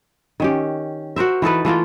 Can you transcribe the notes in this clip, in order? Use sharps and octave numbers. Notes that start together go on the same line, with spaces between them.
D#3 C#4 G4
F#4 A#4 C5 E5
E3 D#4 A4 B4
E3 A3 A#3 F4